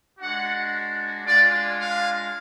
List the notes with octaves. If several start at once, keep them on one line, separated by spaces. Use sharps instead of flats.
G#3 D4 F#4 F#5
G#3 D4 F4 D5
F5